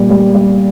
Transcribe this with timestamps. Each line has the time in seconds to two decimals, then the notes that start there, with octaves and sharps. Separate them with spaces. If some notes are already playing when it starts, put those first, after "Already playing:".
Already playing: A#2 G3
0.10 G3
0.35 G3